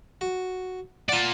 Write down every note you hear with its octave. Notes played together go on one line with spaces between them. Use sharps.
F#4
F4 D5 F#5 A5